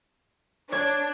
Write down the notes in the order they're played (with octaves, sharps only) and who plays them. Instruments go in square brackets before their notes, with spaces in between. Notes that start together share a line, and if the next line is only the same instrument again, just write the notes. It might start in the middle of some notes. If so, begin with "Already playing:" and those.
[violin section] D4 [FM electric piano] C#5 [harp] G#6